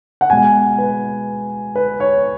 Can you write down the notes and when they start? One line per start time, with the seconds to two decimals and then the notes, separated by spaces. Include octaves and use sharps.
0.21 F#5
0.30 B2 G#3 G#5
0.78 B4
1.75 B4
2.00 C#5